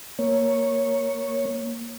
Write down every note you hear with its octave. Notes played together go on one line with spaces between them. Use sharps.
A#3 C#5